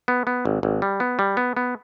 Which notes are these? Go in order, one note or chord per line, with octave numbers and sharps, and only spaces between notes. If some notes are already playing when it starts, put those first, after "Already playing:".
B3
B3
G#1
G#1
G3
B3
G3
B3
B3